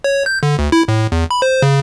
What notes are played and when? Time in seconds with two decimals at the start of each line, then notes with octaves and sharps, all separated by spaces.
0.04 C#5
0.26 G6
0.43 D3
0.59 D2
0.72 E4
0.88 A2
1.12 E2
1.31 B5
1.42 C5
1.62 C#3